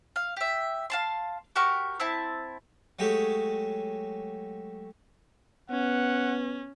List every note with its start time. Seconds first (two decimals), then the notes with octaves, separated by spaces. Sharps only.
0.16 F5
0.37 G4 E5
0.90 F5 A5 C6
1.56 F#4 G4 A#4 C#6
2.00 C4 E4 A5
2.99 F#3 G#3 A3 G4 G#4
5.70 B3 C#4 F#5